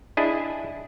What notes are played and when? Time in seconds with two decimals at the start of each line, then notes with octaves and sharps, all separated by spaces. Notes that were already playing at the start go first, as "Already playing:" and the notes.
0.17 D4 E4 G#4 D#5